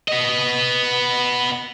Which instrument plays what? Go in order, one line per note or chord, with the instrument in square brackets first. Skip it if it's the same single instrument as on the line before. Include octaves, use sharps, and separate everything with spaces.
[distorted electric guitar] B3 D#5